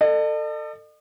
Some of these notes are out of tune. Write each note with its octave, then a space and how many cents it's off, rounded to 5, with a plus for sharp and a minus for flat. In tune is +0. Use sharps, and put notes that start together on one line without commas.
A4 +25 D#5 -45